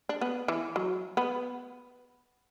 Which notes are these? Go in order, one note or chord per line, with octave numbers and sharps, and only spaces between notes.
D4
B3
E3
F#3
B3